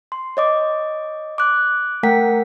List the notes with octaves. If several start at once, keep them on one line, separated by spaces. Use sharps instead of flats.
C6
C#5 D#5 D6
D6 F#6
A3 A#4 F#5 G5 B6